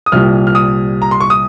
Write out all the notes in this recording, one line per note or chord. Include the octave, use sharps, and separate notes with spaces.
D#6
C2 A#2 G3 F6
F6
D#6
A#5
C6
C#6
D#6